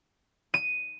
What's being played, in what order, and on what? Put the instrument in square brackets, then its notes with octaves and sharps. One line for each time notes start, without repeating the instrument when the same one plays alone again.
[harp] D#7